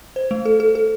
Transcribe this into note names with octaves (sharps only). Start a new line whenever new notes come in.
C5
A3
A4
A4
A4